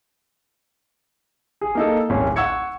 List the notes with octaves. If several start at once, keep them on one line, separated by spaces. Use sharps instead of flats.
G#4
A#3 D#4 A4
D1 G#1 C#4
F#5 C#6 E6 G#6 C#7